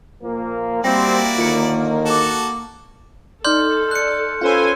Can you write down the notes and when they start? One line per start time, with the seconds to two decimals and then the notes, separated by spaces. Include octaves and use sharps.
0.23 A#2 F3 A#3
0.84 G3 A#3 C4 E4 F#4 D5 G5 A#6
1.38 D#2 D3 D#3 F4 C#7
2.06 F#4 A4 D6 E7
3.45 D#4 A4 D5 C6 F6 G6
3.91 F#6 C#7
4.41 C#4 F4 A4 B4 C5 G#5